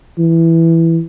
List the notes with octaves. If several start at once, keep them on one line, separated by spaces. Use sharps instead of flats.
E3